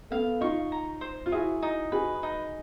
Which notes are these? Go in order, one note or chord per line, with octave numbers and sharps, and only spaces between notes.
A3 B3 F5
D#4 F4 C#6
A#5
C5
F4
E4 F#4 G#4
D#4
F#4 G#4 B4
D#4